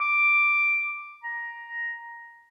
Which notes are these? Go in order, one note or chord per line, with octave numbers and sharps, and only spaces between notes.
D6
A#5